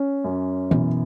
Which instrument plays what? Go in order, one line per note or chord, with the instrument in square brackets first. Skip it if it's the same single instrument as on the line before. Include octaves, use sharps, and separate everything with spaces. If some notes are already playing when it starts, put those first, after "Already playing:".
Already playing: [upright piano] C#4
F#2
[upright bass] B2 [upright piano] E3